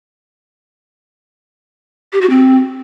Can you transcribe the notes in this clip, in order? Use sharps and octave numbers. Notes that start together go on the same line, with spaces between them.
G4
F#4
C4